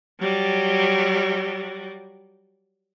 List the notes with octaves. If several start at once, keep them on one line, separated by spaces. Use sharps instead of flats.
F#3 G3